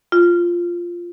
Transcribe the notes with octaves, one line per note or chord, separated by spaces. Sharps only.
F4